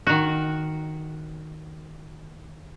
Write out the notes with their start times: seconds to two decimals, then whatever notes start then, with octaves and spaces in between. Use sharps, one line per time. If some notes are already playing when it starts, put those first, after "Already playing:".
0.07 D#3 F#4